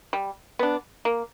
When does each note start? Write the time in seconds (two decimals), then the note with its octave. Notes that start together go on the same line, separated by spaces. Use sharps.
0.13 G3
0.59 B3 D4
1.05 A#3